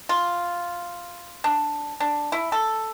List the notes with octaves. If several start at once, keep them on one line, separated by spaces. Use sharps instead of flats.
F4
D4
D4
E4
A4